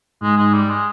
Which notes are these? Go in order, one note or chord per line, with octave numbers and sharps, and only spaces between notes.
G#2 G#3
G#3
G3
G#3